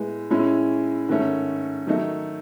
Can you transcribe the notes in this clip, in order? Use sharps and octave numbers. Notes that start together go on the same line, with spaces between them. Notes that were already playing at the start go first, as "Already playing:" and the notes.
Already playing: A2 G#3 B3
A2 G#3 C#4 E4
G#2 D#3 A3 C#4
D#3 F#3 A3 D#4